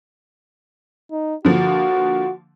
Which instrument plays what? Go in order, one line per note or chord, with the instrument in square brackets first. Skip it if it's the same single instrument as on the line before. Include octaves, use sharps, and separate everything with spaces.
[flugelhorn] D#4
[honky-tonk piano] D3 F3 A#3 [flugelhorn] F#4